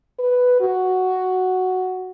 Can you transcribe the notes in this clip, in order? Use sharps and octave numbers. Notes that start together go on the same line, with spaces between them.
B4
F#4